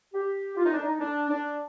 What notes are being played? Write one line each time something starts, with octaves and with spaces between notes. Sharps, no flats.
G4
F4
D#4
D4
D#4
D4
D4